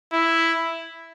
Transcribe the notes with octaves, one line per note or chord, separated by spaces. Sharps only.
E4